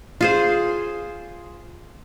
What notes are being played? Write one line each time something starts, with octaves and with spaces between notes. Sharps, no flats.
F4 G#4 C5